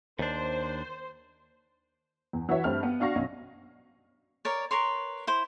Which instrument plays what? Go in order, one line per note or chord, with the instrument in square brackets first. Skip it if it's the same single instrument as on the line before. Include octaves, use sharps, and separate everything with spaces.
[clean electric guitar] D#2 D4 [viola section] C5
[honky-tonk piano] E2
E3 F#4 B4 C#5 E5
G2 A3 C4 G4 F6
B3
D4 F#4 F5 C#6 A#6
B1 C#4
[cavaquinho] A#4 C#5 D5
A#4 B4 C#5 C6
E4 C5